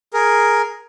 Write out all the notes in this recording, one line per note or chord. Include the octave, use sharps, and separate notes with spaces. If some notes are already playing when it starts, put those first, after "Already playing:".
G#4 A#4